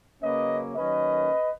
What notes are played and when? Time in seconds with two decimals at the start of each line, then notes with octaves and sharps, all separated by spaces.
0.22 C#3 F#3 A#3 C#4 B4 D#5
0.76 D#3 F#3 A#3 C#4 B4 D#5